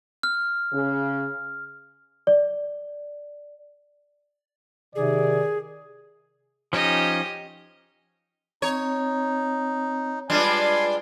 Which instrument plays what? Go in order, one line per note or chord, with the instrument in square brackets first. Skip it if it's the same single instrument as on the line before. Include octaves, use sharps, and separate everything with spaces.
[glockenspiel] F6
[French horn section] C#3
[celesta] D5
[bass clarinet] C3 [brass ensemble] D#3 D5 [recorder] G#4
[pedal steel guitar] F3 C#4 D#4 [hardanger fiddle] G4 D#5
[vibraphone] C4 [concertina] D#4 [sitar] C#5
[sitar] G3 G#3 D4 [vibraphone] F4 B4 [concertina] G#5 A5 C6